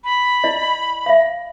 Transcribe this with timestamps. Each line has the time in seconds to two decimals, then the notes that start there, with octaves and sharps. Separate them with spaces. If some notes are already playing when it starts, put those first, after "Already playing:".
0.04 B5
0.44 E4 D5 D#5
1.06 E5 F5